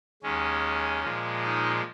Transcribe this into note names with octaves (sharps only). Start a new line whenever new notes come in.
D#2 D#3 G#3 C#4
A#2 F3 G#3
D#4